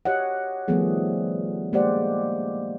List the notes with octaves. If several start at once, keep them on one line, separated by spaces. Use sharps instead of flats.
G4 C#5 D#5 F#5
D#3 F3 G3 A3 B3 G#4
G#3 A#3 G4 C5 D5 F#5